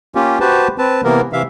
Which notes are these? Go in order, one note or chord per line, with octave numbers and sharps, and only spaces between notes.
A#3 C#4 F4 G4
F#4 G4 B4 C5 A5
C4 B4 A5
C3 E3 A#3 B3 A#4
C3 E3 E5 F5